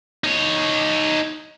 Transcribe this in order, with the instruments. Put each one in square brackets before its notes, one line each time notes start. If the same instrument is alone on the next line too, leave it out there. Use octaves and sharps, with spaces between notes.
[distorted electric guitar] D#4 C#5